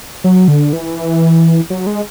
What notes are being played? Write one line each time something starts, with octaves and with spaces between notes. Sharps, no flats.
F#3
D3
E3
F#3
G#3